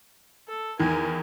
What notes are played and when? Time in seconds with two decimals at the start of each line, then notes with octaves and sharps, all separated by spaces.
0.48 A4
0.79 E2 D#3 A#4 G#5